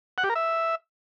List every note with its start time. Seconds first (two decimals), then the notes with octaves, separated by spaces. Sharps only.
0.18 F#5
0.24 G4
0.30 A#4
0.35 E5